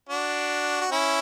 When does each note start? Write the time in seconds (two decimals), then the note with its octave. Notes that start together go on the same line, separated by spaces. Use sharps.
0.09 D4 F#4
0.81 F#4
0.91 C#4 E4